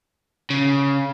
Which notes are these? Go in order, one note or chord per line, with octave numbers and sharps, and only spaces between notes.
C#3